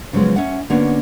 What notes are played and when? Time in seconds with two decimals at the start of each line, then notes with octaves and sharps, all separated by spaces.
0.13 C#3 F3 F#3 G#3 B3
0.36 C#4 E5 F#5
0.70 D3 A#3 B3 C#4 F#4